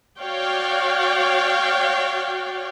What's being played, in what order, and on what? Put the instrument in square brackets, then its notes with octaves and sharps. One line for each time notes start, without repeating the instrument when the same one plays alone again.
[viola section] F#4 C#5 D5 F5 G5